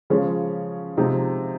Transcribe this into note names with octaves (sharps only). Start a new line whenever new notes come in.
C#3 F3 G#3 C#4
C3 F3 G#3 D#4